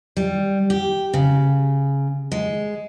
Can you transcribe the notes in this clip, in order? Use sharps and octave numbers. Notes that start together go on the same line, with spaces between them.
G3
G4
C#3
G#3